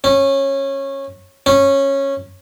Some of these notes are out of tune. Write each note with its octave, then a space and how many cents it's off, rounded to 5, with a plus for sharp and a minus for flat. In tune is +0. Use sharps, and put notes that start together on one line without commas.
C#4 -20
C#4 -15